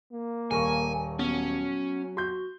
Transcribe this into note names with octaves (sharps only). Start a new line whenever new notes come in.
A#3
D#1 A#4 G#5 C#6
F#3 B3 C#4
F#4 C6 G6